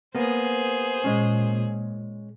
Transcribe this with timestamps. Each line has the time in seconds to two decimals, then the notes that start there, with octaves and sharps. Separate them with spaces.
0.15 A#3 B3 G#4 C5
1.04 A#2 G#3 C#4